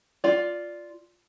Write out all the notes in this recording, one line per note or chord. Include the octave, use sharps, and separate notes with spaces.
F4 D5